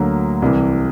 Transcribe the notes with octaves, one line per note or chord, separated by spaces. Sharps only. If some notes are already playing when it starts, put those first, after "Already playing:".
Already playing: D2 D3 F#3 A#3
C2 C3 E3